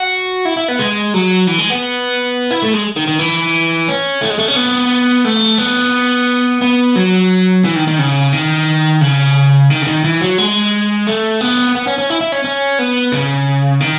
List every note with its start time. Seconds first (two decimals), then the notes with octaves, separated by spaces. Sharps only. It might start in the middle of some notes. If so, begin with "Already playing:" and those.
Already playing: F#4
0.45 E4
0.57 E4
0.68 B3
0.79 G#3
1.14 F#3
1.47 E3
1.59 G#3
1.70 B3
2.51 E4
2.62 A3
2.73 G#3
2.96 D#3
3.07 D#3
3.19 E3
3.88 C#4
4.21 A3
4.30 G#3
4.39 A3
4.48 C#4
4.56 B3
5.25 A3
5.58 B3
6.62 B3
6.96 F#3
7.64 E3
7.76 D#3
7.87 D#3
7.99 C#3
8.33 D#3
9.01 C#3
9.70 D#3
9.82 C#3
9.87 D#3
10.04 E3
10.21 F#3
10.38 G#3
11.07 A3
11.41 B3
11.75 B3
11.87 C#4
11.98 C#4
12.10 E4
12.21 E4
12.32 C#4
12.45 C#4
12.79 B3
13.12 C#3
13.81 D#3